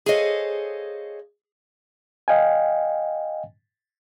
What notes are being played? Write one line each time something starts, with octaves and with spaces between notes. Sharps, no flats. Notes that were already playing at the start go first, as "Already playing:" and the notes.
G#4 A4 C5 C#5 D#5 F5
D#5 F5 G5 G#5